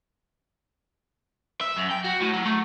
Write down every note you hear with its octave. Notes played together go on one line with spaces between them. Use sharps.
E5
F#2
G5
F#4
A2
F#3
A3